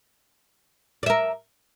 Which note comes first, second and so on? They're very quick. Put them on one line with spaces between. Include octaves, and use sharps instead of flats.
D5 E5 A#4